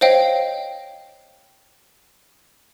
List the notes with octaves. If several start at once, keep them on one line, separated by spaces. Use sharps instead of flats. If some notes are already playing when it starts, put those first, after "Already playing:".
C5 C#5 D#5 F5 G5